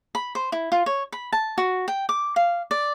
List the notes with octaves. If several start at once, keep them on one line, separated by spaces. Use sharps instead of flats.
B5
C5
E4
F4
C#5
B5
A5
F#4
G5
D6
F5
D5